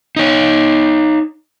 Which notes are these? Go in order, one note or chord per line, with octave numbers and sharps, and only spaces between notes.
D#4 C#5